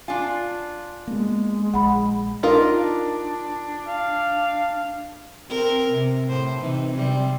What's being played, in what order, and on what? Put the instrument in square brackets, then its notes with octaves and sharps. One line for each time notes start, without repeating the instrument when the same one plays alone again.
[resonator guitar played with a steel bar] D4 F4 [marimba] G#5
[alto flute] G#3 [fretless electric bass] A#3 B3
[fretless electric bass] A#1 [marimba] F#5 B5
[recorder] D4 [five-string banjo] D#4 F4 A#4
[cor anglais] F5
[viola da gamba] C4 A#4
C3
A2 C5
C3 E3 D#4
C3 G3 C4